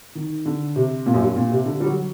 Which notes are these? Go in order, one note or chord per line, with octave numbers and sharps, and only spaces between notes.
D#3
D3
C3
A#2
F#2
G2
A#2
C3
D3
G3
F#3